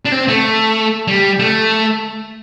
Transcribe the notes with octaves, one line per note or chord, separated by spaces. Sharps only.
D4
C4
A3
G3
A3